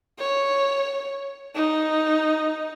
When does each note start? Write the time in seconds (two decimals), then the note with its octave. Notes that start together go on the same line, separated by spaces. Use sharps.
0.19 C#5
1.55 D#4